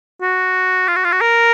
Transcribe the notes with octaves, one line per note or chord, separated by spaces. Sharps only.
F#4
F4
F#4
F4
F#4
A#4